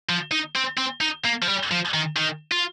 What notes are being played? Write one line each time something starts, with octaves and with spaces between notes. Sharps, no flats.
F3
D#4
C4
C4
D#4
A#3
F3
G3
F3
D#3
D#3
F4